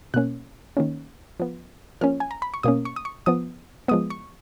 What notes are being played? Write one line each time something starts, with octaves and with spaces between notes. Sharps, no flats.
B2 A#3 C#4 F#6
D#3 A#3 C#4
F3 B3
F3 A#3 C#4 F6
G#5
A#5
B5
C#6
B2 A#3 C#4 D#6
C#6
D#6
C#6
F3 B3 D#6
F3 G#3 B3 D#6
C#6